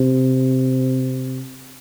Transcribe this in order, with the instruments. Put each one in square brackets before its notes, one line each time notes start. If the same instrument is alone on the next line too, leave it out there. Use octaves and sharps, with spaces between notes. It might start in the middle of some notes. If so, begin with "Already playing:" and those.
Already playing: [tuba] C3